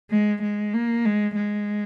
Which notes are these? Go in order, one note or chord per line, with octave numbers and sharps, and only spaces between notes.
G#3
G#3
A#3
G#3
G#3